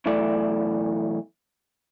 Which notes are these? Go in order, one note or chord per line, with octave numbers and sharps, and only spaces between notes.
B1 E2 E3 A3 D5